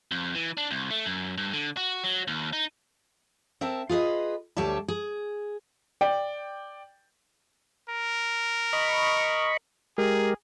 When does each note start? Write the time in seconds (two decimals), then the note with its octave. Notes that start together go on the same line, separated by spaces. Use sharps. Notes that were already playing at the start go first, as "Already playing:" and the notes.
0.11 F2
0.35 E3
0.57 D4
0.71 C2
0.91 A3
1.06 F#2
1.38 G2
1.53 D3
1.77 F#4
2.04 F#3
2.28 D#2
2.53 D#4
3.61 C4 A#4 E5 A5
3.89 F4 G#4 B4 D#5
4.57 D2 G3 C#5 D5 E5 A5
4.88 G#4
6.01 D5 G5
7.89 A#4
8.73 D#5 B5 C#6
9.98 G#3 G4 G#4 A#4